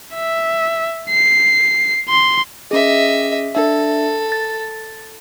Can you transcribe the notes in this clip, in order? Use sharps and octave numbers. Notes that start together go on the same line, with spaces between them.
E5
C7
C6
C#4 G#4 D#5 E5
D4 A4 E5
A6